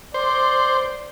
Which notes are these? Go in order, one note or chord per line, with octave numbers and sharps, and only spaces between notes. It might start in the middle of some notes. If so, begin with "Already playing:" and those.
C5 D5